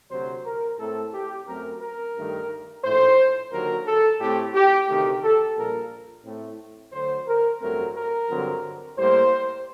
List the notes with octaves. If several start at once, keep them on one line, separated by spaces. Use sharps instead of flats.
D2 C3 F#3 C5
A#4
A2 A3 C4 A4
G4
F#2 F#3 A3 C4 A#4
A#4
G2 D#3 A3
A#1 A2 A3 C5
D#2 D3 F#3 A#4
A4
A2 A3 C4 G4
G4
D2 C3 D#3 A3 G4
A4
A#1 A#2 G3 A#3 A#4
A2 A3 C4
D2 D3 F#3 C5
A#4
A1 G2 F#3 A3 C4 A#4
A#4
G2 D3 F#3 C4
A2 G3 A#3 C5